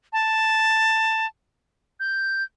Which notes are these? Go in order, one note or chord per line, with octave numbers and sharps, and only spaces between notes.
A5
G6